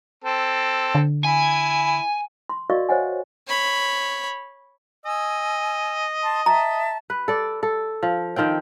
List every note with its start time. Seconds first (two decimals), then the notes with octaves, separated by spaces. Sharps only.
0.24 C4 A4
0.95 D3
1.25 E4 G#5
2.49 C6
2.70 F#4 A#4 D5 D#5 F5 C#6
2.89 C5 C#5 D#5 F#5 G#5
3.47 C#5 B5
5.05 D#5 G#5 E6
6.21 A5 C6
6.46 E5 A5 A#5
7.10 B4
7.28 A4 D5
7.63 A4
8.03 F3
8.36 D#3 F3 C4 G5